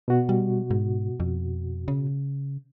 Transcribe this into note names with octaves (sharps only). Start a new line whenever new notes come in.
B2 F#4
G3
G#2
F2
C#3